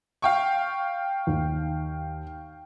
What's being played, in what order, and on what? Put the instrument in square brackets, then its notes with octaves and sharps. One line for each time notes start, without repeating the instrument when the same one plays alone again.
[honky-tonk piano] F5 G5 C#6
[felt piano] D#2